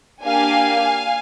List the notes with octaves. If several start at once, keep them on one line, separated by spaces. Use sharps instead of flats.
A#3 D4 G4 F5 G#5